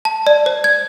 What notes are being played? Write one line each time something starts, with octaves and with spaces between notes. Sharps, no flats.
A5
D5
C5
G#6